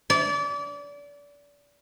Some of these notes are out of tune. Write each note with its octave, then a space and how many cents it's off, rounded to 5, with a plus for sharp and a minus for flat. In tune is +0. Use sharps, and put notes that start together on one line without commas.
D5 -30